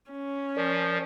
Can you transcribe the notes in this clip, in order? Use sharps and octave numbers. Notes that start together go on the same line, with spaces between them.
C#4
F3 A#4 D5